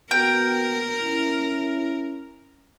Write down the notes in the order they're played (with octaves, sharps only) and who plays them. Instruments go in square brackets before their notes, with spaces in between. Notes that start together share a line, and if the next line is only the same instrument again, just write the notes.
[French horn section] B3 F#4 [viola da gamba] A#4 [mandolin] G5
[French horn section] C#4 E4